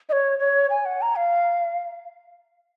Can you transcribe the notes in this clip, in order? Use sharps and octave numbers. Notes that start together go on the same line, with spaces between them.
D#5
C#5
C#5
G#5
F#5
A#5
F5